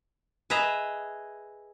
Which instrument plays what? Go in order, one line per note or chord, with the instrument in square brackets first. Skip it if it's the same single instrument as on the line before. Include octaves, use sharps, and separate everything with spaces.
[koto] G#4 B4 D#5 E5 A#5